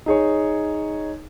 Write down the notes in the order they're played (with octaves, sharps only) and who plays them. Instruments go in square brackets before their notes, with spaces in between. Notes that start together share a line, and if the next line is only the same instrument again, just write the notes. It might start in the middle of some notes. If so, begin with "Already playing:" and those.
[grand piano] D#4 G#4 C#5